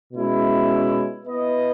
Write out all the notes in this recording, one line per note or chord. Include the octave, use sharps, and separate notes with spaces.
B2 G#3 C#4 E4
B3 E4 B4 D#5